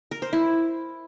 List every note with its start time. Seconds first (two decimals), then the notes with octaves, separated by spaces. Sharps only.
0.11 A#4
0.22 C5
0.33 E4